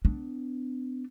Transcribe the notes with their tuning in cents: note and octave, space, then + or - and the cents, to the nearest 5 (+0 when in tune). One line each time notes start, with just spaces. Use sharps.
B3 +45 D4 +10